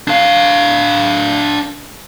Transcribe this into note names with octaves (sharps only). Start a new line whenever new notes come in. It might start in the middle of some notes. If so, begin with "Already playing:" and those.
D4 F5